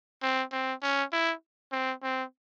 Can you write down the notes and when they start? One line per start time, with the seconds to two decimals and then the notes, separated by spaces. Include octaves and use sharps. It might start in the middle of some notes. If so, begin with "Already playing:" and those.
0.23 C4
0.52 C4
0.82 C#4
1.13 E4
1.72 C4
2.03 C4